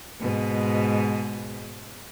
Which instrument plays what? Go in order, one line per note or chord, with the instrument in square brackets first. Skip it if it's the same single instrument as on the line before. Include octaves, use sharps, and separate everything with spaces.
[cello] G#2 B2